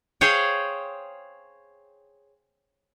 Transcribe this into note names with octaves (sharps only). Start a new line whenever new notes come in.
G#4 C5 C#5 F5 G5